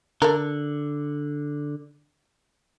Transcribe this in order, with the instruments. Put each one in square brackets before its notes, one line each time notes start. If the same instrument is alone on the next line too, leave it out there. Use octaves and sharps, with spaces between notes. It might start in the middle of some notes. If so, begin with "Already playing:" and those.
[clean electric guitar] D3 [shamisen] A4 A#4